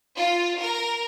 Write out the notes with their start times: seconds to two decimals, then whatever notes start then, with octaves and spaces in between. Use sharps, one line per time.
0.17 F4
0.59 A#4